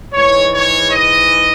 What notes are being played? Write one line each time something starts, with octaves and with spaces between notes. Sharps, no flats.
G#2 E3 G#3 C#5
C#5
D#5